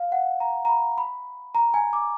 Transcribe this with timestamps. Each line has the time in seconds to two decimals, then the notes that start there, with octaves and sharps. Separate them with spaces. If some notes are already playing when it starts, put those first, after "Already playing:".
Already playing: F5
0.12 F#5
0.40 A#5
0.65 A#5
0.69 B5
0.98 B5
1.55 A#5
1.74 G#5
1.93 D6